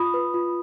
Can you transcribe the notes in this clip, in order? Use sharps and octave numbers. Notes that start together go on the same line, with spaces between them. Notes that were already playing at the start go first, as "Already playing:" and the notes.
Already playing: F4 B5 D#6
B4
F4